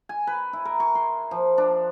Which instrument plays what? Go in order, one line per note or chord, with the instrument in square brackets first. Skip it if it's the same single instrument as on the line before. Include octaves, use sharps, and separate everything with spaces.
[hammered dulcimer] G#5
B4
E4
A#4
C#6
C6
F3
D4